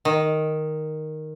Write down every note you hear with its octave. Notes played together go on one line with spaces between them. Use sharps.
D#3